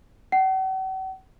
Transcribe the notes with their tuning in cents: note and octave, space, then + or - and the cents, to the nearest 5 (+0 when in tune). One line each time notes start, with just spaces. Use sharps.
F#5 +45